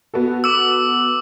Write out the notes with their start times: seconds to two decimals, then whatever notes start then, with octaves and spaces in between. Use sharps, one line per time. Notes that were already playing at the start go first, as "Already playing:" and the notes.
0.14 B3 F#4 A4
0.44 D6 E6